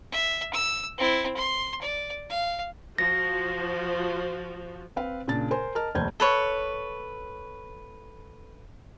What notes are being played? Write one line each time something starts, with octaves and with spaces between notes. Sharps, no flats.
E5
E6
C4 E4
C6
D5
F5
F3 F#4 A#6
C4 B4 F5
A#2 C#3 D4 A5 A6
A#4 C5 G#5 C6
A#4 D#5 A5 F6
F1 D#2 C5 A5 G6 G#6
A4 B4 C#5